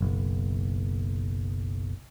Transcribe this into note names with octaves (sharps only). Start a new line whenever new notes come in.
F#1 B1